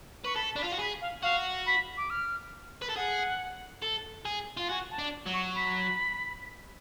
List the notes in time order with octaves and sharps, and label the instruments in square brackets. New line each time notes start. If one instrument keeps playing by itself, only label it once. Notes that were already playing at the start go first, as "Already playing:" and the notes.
[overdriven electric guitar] B4 [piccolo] C#6
[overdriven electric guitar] A4 [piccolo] B5
[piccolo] A5
[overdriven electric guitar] D4 [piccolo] B5
[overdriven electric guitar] F4
F#4
[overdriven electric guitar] G#4 [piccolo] B5
[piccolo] F5
[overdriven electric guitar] F#4 [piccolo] F5
[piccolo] B5
D6
F6
[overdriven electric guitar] B4
A4
[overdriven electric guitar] G#4 [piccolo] F#5
[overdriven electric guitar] A4
G#4
F4
[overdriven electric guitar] F#4 [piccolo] G#5
[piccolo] A5
[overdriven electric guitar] D4
F#3
[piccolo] C#6
B5